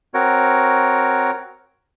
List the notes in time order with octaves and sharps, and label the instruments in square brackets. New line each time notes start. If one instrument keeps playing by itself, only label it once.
[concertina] C4 F#4 A#4 C#5